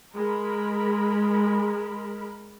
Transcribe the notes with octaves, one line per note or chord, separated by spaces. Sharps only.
G#3 A#4 B5